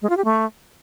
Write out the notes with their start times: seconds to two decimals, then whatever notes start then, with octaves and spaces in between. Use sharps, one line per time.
0.02 G#3
0.09 F4
0.17 G4
0.25 A3